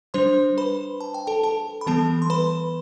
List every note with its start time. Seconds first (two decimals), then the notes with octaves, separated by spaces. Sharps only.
0.14 G3 D4 C5 C6
0.58 B4 B5
1.01 A5
1.14 G5
1.27 A4 A5
1.43 A4 A5
1.81 B5
1.87 E3 G3 B3 A4 A5
2.22 C6
2.30 B4 B5